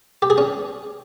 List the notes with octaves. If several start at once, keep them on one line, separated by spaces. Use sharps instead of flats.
G4
G#4
C#4